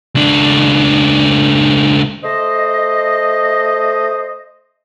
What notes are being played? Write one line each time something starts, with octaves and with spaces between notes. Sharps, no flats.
C#2 D4
A3 C5 D#5